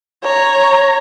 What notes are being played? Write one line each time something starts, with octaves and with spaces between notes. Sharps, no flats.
C#5 A#5